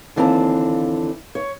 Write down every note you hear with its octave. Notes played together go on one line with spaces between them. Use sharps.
D#2 D3 E3 C4 F4 A5
C#5